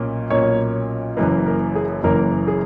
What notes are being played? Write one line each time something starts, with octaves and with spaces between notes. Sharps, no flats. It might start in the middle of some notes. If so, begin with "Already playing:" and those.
Already playing: B1 A#2 A#3 C#4
B1 A#2 A#3 C#4 C#5
F#1 F#2 E3 A#3 B4
A#4
G#4
F#1 F#2 E3 A#3 A#4
G#4